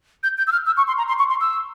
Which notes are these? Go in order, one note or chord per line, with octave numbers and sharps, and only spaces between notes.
G6
G6
E6
F6
E6
C#6
C6
A#5
C6
C#6
C6
E6